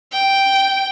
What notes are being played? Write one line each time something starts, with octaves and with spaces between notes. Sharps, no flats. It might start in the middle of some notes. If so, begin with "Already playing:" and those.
G5